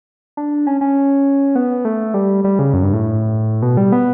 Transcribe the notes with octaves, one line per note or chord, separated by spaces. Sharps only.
D4
C#4
C#4
B3
A3
G3
G3
C#3
F#2
G2
A2
B2
G3
B3